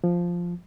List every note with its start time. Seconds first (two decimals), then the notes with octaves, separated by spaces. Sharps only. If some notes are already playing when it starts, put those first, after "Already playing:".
0.04 F3